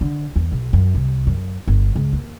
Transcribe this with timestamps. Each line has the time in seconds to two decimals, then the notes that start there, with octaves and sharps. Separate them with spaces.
0.01 D3
0.36 E2
0.52 B1
0.73 F#2
0.95 C2
1.27 F#2
1.68 G1
1.96 C#2
2.13 D#2